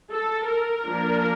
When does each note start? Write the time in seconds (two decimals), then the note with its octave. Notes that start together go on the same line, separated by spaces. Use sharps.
0.12 A4
0.47 A#4
0.84 F3 A#3 D4